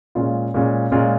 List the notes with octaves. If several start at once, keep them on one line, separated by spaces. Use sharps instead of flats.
A#2 G#3 C#4 F4
A#2 G#3 C#4 F4
A#2 G#3 C#4 F4